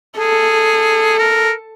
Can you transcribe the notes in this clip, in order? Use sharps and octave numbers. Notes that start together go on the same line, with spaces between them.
G#4 A4
A#4